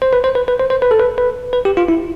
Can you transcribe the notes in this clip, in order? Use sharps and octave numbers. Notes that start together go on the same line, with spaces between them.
C5
B4
C5
B4
B4
C5
C5
B4
A4
B4
B4
B4
G4
F4
E4